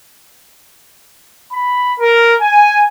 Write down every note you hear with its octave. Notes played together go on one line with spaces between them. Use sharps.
B5
A#4
G#5